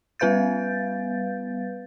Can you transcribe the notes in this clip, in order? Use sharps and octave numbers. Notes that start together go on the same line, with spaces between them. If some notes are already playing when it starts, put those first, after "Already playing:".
G3 B3 B4 F5 G6 A6